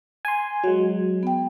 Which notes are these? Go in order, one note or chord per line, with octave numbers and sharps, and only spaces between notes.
G#5 C6
F#3 G#3 F#4
B3 G5